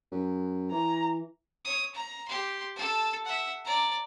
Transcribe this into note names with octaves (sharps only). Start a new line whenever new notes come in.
F#2
E3 A#5
C#5 D#6
A#5
G4 C6
A4 A5
E5 F#5
D5 A#5